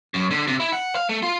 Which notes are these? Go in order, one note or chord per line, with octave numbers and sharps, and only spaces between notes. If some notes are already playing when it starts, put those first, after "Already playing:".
F#2
D3
C3
E4
F#5
F5
A3
F4